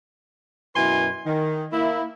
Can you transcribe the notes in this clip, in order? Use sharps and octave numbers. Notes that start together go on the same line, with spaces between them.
F#2 B2 E4 B4 G#5 C6
D#3
A#3 E4